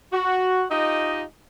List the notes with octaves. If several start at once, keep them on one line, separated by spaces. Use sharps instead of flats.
F#4
D#4 F4 G4 D#5